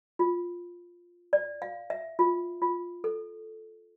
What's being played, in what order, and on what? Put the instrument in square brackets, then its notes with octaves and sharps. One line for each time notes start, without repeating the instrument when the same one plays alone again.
[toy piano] F4
D5
F5
E5
F4
F4
A4